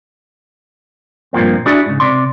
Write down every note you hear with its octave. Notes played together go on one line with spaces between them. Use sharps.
G2 A#2 F3 A#3 C4
D4 E4 F#4 G#4 D5
G#2 C#3
C3 D5 C6